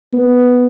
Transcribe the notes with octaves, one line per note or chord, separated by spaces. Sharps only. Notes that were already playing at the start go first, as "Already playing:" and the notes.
B3